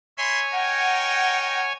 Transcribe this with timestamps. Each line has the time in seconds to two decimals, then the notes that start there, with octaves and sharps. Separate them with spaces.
0.18 C#5 E5 G#5 B5 C6
0.53 D#4 A#4 F#5 G5